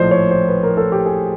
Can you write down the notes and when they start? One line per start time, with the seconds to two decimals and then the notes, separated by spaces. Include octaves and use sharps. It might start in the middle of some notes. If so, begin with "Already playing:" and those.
Already playing: A#1 A2 F3 C5 D5 D#5
0.11 C#5
0.31 C5
0.49 B4
0.63 A#4
0.77 A4
0.92 G4
1.06 G#4